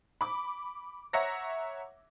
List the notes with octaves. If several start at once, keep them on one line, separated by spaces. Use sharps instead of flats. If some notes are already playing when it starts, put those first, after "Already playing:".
B5 D6
C#5 E5 F#5 A#5 A#6